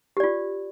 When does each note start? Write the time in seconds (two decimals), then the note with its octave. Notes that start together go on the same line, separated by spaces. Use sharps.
0.17 G4
0.20 D5
0.24 F4